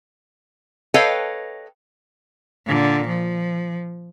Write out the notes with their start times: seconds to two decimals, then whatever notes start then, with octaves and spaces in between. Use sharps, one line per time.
0.94 A4 B4 C#5 D#5 F5 G5
2.66 A#2 D3
3.07 F3